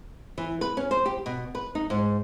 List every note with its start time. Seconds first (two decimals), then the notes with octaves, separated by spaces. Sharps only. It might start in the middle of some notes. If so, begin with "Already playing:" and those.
0.38 E3
0.61 B4
0.77 C#4
0.91 C5
1.06 G4
1.26 B2
1.55 B4
1.75 D#4
1.90 G#2